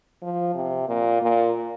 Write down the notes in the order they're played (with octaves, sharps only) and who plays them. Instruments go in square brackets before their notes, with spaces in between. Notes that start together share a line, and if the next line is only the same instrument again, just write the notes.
[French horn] F3
C3
A#2
A#2